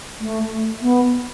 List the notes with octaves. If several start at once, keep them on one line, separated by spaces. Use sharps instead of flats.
A3
B3